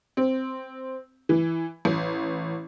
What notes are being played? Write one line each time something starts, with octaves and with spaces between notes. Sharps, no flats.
C4
E3
A1